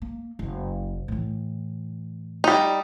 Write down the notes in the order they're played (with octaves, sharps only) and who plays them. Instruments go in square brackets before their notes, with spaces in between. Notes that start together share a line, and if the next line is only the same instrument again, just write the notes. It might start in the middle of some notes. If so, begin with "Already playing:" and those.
[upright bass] A#3
F#1
A2 E3
[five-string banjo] G3 D#4